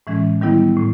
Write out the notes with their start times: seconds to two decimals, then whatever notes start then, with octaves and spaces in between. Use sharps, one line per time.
0.07 A2 E3 G#3 C#4
0.41 D#3 G3 B3 E4
0.77 A2